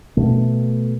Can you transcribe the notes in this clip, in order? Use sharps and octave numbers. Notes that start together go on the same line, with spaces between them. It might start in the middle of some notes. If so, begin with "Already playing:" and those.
B2 A3